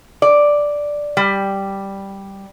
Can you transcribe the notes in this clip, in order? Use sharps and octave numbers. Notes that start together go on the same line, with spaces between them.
D5
G3